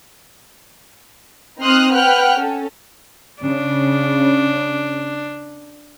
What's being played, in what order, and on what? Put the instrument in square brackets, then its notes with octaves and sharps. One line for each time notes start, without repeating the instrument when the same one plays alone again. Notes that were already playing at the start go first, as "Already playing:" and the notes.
[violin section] C4 D#4 C6 D#6 F6 F#6
B4 F#5 G5 F6 F#6
C#4 A4
[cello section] C#3 [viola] D4